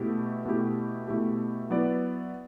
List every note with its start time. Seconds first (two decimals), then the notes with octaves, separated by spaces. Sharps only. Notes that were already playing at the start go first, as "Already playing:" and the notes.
Already playing: B2 A3 E4 G4
0.45 B2 A3 E4 G4
1.07 B2 A3 E4 G4
1.70 F#3 B3 E4 B4 D5